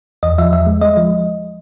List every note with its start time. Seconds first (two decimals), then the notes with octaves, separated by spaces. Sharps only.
0.23 E2 D#5
0.38 F3 E5
0.52 E2 E5
0.66 G#3
0.81 G#3 D#5
0.97 F3